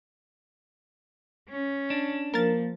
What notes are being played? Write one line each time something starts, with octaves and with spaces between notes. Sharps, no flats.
C#4
D4
F3 A#3 A#4 A6